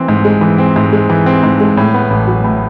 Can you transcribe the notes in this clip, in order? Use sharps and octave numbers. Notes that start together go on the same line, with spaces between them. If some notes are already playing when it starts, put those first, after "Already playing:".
Already playing: E3 C4
G#2
G#3
E3
C4
G#2
G#3
E3
C4
G#2
G#3
A2
B3
A1
F#3
A2